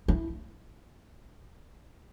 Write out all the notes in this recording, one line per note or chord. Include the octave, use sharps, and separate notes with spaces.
E4